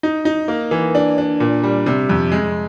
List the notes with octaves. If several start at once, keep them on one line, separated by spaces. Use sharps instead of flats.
D#4
D#4
A#3
E3
D4
D4
A#2
G3
C3
F2
G#3